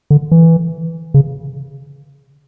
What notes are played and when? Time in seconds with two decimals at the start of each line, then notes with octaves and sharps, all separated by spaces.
0.10 D3
0.32 E3
1.14 C#3